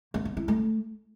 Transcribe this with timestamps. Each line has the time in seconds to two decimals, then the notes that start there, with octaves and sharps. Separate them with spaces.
0.14 A#3
0.25 B3
0.37 E4
0.48 A3